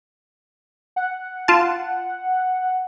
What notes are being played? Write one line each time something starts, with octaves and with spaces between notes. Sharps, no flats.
F#5
F4 A5